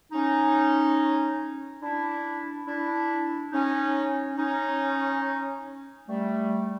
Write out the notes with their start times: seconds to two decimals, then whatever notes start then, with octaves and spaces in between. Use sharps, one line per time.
0.12 C#4 D#4
1.82 D4 E4
2.67 D4 E4
3.52 C#4 D#4
4.37 C#4 D#4
6.07 G3 A3